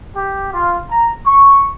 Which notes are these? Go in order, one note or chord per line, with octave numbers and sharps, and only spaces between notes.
G4
F4
A#5
C#6